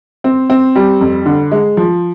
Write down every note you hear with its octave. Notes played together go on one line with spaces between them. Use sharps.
C4
C4
G3
F2
D3
G#3
F3